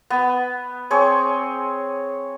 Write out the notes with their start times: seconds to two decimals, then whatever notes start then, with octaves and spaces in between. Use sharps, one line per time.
0.10 B3
0.91 C4 G#4 C#5